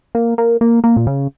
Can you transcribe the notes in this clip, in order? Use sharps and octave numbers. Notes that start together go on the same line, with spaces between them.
A#3
A#3
A#3
A#3
A#2
C#3